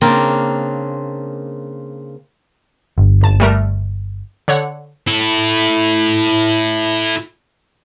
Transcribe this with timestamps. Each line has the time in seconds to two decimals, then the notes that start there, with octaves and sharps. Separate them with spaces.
0.01 C#3 A#3 C4 D4 A#4
2.98 G1
3.21 G#1 A5
3.40 G3 A3 A#4
4.48 D3 C#5 F#5
5.07 E4 A4